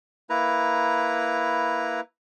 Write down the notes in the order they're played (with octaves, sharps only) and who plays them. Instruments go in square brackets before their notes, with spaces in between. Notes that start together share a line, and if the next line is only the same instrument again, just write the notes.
[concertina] A#3 E4 B4 A#5